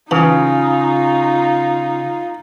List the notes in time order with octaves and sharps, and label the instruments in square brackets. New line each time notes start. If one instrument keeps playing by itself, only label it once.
[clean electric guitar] C#3 [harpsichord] E3 [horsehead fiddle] D#4 F4